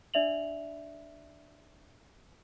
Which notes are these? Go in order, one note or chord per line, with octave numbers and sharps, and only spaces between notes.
D4 D5 E5 F7 F#7